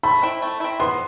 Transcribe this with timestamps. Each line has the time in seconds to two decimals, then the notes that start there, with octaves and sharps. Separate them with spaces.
0.03 A3 B5
0.23 C4 E4
0.42 A3
0.60 C4 E4
0.80 B3 C6